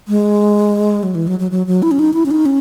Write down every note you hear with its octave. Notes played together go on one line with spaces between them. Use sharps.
G#3
F#3
E3
F#3
F#3
F#3
F#3
E4
C#4
D#4
E4
C#4
D#4
C#4